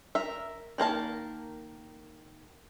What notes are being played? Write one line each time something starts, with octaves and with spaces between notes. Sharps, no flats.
A#4 E5
D#3 A#3 A#4 A5